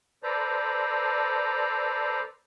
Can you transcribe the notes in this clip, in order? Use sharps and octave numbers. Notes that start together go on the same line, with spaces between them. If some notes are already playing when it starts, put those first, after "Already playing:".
A4 B4 C5 D5 A#5